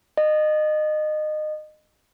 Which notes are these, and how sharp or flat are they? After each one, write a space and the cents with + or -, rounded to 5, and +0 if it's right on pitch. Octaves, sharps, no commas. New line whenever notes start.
D#5 -25